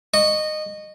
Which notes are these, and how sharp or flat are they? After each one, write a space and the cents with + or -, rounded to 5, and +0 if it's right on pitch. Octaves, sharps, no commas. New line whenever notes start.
D#5 -20 C#6 +0